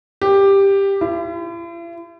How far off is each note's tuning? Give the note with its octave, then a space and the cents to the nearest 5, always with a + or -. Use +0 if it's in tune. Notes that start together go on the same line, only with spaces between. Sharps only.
G4 +10
E4 +45